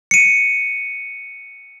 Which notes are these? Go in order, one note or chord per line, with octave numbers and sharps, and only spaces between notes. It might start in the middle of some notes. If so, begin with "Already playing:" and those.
C#7 D#7